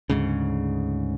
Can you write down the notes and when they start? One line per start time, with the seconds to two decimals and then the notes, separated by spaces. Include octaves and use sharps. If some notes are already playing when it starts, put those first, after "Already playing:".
0.10 D2 G#2 C#3